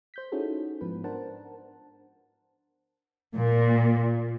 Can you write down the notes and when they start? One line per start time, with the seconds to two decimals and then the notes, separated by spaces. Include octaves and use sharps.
0.14 C5 G6 B6
0.32 C#4 D#4 E4 F#4 G#4 A4
0.81 G#2 F3 B3 B4
1.04 D4 A#4 C5 F#5 A5
3.35 A#2